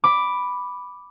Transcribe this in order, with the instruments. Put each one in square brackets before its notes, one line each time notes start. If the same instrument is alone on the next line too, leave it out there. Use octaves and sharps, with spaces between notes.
[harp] B5 D6